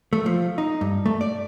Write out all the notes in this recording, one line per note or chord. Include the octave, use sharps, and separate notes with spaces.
A3
F3
D#4
G2
A3
D5